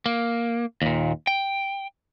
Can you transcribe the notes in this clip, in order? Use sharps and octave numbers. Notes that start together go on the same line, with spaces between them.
A#3
D#2 A#2
G5